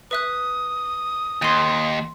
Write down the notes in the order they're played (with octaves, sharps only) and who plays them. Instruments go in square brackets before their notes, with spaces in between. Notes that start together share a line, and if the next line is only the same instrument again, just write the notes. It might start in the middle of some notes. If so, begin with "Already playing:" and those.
[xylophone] B4 E5 F#6 [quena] D#6
[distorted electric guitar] D#2 [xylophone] C6 D#7